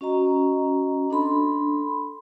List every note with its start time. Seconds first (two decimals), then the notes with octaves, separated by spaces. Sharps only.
0.01 C#4 F#4 D#5 A#5
1.10 D4 A4 B5 C6